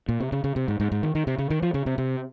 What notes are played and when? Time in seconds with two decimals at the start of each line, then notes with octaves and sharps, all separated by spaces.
0.09 A#2
0.20 C3
0.32 C#3
0.44 C#3
0.56 C3
0.68 G#2
0.80 G#2
0.92 G#2
1.03 D#3
1.15 D#3
1.27 C3
1.38 C#3
1.50 D#3
1.62 F3
1.74 C#3
1.86 C3
1.98 C3